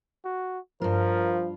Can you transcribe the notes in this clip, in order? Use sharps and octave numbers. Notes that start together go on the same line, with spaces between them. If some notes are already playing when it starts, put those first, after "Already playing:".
F#4
G2 F3 F4 A#4